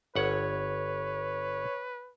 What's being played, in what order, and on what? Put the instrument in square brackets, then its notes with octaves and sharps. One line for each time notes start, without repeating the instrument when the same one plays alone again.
[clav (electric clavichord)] G1 F#5 [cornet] B4 [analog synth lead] C#5